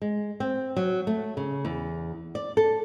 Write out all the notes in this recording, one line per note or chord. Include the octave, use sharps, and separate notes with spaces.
G#3
C4
F#3
A3
C#3
E2
D5
A4